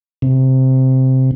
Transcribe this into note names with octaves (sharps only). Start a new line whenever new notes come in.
C3